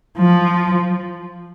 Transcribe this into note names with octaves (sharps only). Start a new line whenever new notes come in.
F3